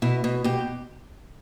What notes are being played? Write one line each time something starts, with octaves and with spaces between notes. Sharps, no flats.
B2 E4
B2
B2 G4